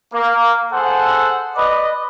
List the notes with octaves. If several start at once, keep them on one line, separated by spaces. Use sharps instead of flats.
A#3
G#4 A4 C5 F#5
B4 D5 D#5